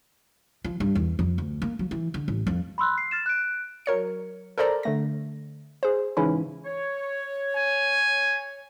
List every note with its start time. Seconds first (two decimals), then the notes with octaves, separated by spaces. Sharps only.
0.64 F3
0.80 G2
0.95 E2
1.19 F2
1.38 D2
1.62 A#3
1.79 F#3
1.91 E3
2.14 D3
2.28 A1
2.47 F2
2.78 B5 C6 E6 F#6
2.98 C7
3.11 F6 A6 E7
3.26 F#6 D7
3.86 F#3 A#4 C#5 C#7
4.58 A4 A#4 C5 D5 A#5
4.83 D3 A3 A#6
5.83 G#4 C5
6.17 G#2 C#3 E3 C#4 E4
6.65 C#5
7.55 G#5